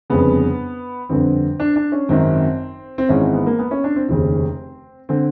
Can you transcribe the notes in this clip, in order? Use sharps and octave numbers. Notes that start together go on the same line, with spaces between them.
G1 F2 C#3 B3
G1 F2 D3 C4
D4
D4
C#4
G#1 F#2 D#3 C4
C4
G#1 G#2 E3 C#4
C4
B3
A#3
B3
C#4
D4
C4
F1 D#2 C#3 C4
D3 C4